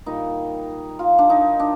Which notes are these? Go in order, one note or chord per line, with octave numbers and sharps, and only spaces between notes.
A#2 G3 D#4
F4
D4
D#4
D4